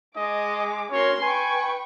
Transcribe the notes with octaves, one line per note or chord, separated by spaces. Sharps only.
G#3 D#5 D6
C#4 F#4 A#4 C#5 C6
B4 G5 G#5 C#6